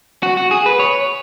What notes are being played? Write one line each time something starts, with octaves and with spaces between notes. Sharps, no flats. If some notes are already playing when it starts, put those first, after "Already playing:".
F#4
F#4
G#4
B4
C#5